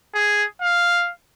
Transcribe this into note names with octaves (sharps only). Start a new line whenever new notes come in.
G#4
F5